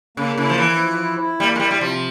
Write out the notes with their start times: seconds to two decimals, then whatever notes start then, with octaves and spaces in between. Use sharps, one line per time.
0.17 C#3 A#3
0.37 C#3 E4
0.49 F3
0.58 E3 E4
0.78 F3
0.99 E4
1.19 E4
1.40 G3 A#3
1.56 G#3
1.60 G3 E4
1.71 G3
1.80 C3 F3